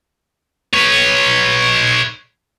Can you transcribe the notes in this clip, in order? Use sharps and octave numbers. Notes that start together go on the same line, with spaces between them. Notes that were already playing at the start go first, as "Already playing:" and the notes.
B4 C#5